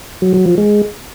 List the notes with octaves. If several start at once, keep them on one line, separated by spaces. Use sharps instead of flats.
F#3
F#3
F3
G#3